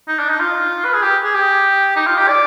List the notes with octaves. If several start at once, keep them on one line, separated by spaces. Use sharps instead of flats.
D#4
D4
D#4
F4
B4
G#4
G4
G#4
G4
D#4
F4
G4
D5